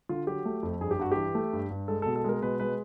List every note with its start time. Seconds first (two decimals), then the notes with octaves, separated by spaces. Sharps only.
0.09 D3 F4
0.27 F#3 G4
0.45 A3
0.63 F2
0.81 G2 G#4
0.91 G4
0.99 G2 F#4
1.12 E3 G4
1.35 A3
1.53 G2
1.71 G2
1.88 G#3 A4
2.02 B2 A4
2.16 A4
2.24 G#3 A#4
2.42 B2 B4
2.60 G#3 B4